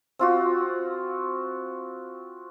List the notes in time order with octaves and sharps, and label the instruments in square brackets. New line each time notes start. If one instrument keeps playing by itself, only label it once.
[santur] C4 F4 F#4